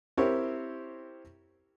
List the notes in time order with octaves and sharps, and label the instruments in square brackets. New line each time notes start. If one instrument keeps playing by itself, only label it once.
[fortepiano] C4 E4 G4 A#4 C#5